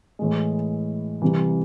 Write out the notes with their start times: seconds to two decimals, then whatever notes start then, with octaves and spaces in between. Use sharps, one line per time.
0.19 A2 E3 G#3
1.22 C2 C3 E3